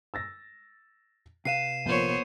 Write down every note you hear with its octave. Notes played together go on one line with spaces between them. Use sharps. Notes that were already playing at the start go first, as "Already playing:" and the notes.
E6 A6 A#6
C3 B4 F5 C7 D#7 E7
A#1 F3 A#3 B3 C5 C#5